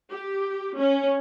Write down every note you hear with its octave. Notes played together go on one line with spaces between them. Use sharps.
G4
C#4